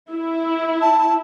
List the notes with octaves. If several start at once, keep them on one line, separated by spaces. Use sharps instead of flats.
E4
A5